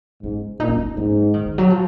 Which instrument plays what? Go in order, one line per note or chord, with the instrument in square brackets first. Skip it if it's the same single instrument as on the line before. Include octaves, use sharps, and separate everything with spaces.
[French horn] G#2 [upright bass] C#4
[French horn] A#2 [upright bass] D#4
[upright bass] C#4
D#4
[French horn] G#2 [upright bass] C#4
[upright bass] F3
D#3
D#3
F#3
F3